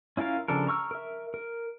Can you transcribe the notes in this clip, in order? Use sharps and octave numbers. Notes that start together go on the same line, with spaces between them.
C#4 E4 F4 A#4 F5
C#3 F3 D4 A4 A#4
A#5 C#6 E6 F6
A#4 E5
A#4